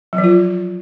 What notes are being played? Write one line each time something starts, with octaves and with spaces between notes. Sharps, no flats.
F#3
F3
F4